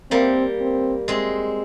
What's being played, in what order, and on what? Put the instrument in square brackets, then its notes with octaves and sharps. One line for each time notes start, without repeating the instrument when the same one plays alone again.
[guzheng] G3 A#3 [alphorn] C4
[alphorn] C4
[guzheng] G#3 C4